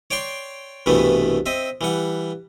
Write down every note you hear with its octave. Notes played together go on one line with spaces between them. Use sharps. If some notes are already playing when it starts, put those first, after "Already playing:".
C#5 D5 G5 C6 C#6
C2 G2 B2 E3 A3 B3
C4 D#5 E5
E3 G3 F#5